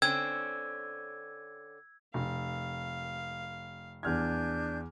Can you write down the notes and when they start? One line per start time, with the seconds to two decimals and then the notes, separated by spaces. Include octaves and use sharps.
0.02 D3 C4 C#4 E6 G#6
2.14 F1 F5
4.03 E2 D4 G#5 F6 G6 G#6